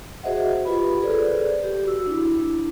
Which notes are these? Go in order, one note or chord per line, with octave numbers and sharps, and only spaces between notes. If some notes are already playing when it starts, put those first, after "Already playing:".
F#4 G#4 C5 D#5 E5 F#5
F4 G4 B4 B5
G#4 A4 B4 C5 D5
G4
F#4 E6
D4 E4